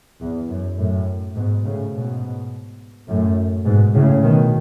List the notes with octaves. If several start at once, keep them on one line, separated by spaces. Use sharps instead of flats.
E2
F#2
F#2 A2
G#2 B2
A2 C#3
G#2 B2
F#2 A2
G#2 B2
A2 C#3
B2 D#3